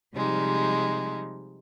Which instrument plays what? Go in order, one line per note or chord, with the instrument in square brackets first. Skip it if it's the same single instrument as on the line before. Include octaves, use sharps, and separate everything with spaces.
[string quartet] C3 F3 G3 G#3 D#4